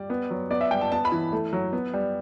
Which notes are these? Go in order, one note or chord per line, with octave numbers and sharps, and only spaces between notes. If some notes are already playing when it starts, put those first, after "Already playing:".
Already playing: G3 D5
B3
F#3
B3 D5
E5
G3 G5
A5
B3 A5
B5
E3
A3
F#3
B3
G3